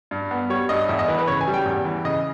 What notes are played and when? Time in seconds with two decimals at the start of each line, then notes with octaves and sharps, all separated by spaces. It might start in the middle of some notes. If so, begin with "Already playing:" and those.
0.11 G2
0.31 B3
0.50 G3 C#5
0.69 G2 D#5
0.88 E2 E5
0.99 D#5
1.08 E3 B4
1.19 B4
1.27 C#3 C#5
1.41 G#5
1.48 G3
1.54 G5
1.66 E2
1.85 E3
2.05 C#3 D#5